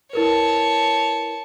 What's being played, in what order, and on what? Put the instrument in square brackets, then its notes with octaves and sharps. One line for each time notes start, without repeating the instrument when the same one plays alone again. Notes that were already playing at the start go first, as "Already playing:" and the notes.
[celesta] E4 A#4 B4 [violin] C#5 A5